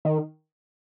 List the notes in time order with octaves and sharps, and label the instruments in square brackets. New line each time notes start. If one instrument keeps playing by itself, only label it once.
[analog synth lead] D#3